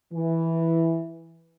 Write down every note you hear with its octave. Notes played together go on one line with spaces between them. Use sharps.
E3